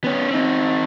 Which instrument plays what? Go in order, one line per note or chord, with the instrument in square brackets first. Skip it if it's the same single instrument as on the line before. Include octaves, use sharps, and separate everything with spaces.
[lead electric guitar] B3 C#4
C4 D#4